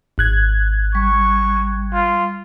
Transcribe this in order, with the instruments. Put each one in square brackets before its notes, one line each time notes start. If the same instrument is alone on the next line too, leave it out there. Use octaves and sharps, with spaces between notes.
[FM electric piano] G#1 F#6 G#6
[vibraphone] G3 [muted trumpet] C#6
[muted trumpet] F4